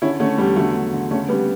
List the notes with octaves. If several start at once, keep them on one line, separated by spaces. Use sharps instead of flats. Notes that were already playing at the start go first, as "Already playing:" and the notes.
D3 C#4 E4
D3 A3 C#4
E2 G3
D3 F#3 A3
D3
D3
C#3 A3 C#4
C#3 G3 B3